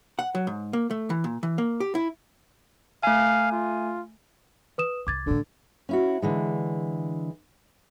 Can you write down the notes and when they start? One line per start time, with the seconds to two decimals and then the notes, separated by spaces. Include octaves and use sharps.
0.19 F#5
0.35 F#3
0.47 G#2
0.73 A#3
0.91 A3
1.10 E3
1.24 A#2
1.43 E3
1.58 A#3
1.80 G4
1.95 E4
3.03 A3 F5 G#5
3.52 F4
4.78 B4 D#6 E7
5.07 C2 D#3 D6 G#6 A6
5.26 A1 A2 D3
5.89 C#4 E4 F#4
6.22 D3 E3 G#3